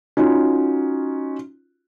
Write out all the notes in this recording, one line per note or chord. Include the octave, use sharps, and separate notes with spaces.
C#4 D#4 F4 F#4